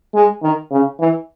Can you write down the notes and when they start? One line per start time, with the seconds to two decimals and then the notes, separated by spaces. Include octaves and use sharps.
0.14 G#3
0.42 D#3
0.71 C#3
1.00 E3